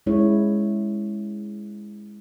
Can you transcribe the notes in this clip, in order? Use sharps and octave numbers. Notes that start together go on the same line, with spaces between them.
G#3 C#4 E4 C#5